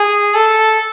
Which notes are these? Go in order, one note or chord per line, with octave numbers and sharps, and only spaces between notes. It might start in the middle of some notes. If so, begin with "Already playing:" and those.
Already playing: G#4
A4